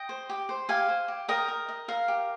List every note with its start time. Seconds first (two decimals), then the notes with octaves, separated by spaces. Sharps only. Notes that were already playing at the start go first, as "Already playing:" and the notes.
Already playing: D#5 G5
0.09 C5
0.29 G4
0.49 C5
0.69 G4 F5 G#5
0.88 C5
1.08 G4
1.28 A#4 D#5 G5
1.48 A#4
1.68 D#5
1.88 A#4 F5
2.08 G4